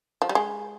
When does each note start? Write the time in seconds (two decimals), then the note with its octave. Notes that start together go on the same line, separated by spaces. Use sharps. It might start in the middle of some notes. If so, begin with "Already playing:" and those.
0.22 F3
0.29 G3
0.35 G#3